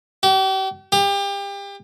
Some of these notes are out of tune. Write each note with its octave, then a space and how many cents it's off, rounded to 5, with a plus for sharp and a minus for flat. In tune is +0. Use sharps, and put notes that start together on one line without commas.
G4 -40
G4 +30